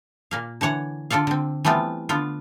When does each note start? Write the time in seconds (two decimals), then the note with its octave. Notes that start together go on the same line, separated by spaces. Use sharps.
0.31 A#2 A#3 F5
0.61 D3 E3 C#5 F#5
1.10 D3 F4 A4 D5 F5
1.27 D3 C4
1.65 E3 G3 A3 B3 C4 F4
2.09 D3 B3 F4